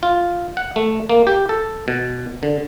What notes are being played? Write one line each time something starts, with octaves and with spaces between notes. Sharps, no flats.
F4
F#5
A3
A#3
G4
A4
B2
D3